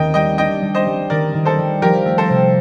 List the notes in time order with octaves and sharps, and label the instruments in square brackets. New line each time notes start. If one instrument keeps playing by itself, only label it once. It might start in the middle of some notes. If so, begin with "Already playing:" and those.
Already playing: [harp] D#2 D#3 [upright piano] D#5 G5
[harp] G3 [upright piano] D#5 G5
[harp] D4 [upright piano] D#5 G5
[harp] G3
[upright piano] C5 D#5
[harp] G3
[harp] D#3 [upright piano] A#4 D5
[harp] D#3
[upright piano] A4 C5
[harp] G3
[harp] F3 [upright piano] G4 A#4
[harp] A3
[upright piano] A4 C5
[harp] C3